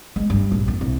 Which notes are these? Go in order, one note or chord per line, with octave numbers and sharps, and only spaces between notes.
G#3
G2
A#1
F2
C2